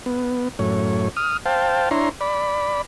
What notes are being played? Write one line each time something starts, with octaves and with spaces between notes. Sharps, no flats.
B3
F#2 A2 C#5
D#6 F6
C5 F5 G5 A5
D4 E4 C#5 A#5 C6
D5 B5